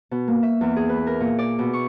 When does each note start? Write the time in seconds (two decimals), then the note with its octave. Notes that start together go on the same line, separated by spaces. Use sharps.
0.11 B2
0.28 A#3
0.43 E5
0.61 E2
0.76 G#4
0.89 B4
1.07 A#4
1.21 A#2
1.38 D5
1.59 B2
1.73 C#6